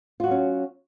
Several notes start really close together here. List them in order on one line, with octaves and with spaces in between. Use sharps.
F4 F#4 F#3 C#4